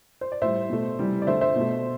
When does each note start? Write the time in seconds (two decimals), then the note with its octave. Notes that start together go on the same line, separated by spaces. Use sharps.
0.21 C5
0.32 D5
0.42 A2 G3 C5 E5
0.70 B2 A3
0.99 C3 E3 G3
1.22 D5
1.27 D3 A3 C5 E5
1.41 C5 E5
1.56 B2 A3